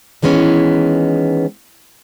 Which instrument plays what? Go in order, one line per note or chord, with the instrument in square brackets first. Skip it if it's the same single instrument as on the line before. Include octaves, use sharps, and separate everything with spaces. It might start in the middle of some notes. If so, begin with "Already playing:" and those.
[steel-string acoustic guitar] D#3 E3 G#3 B3 C#4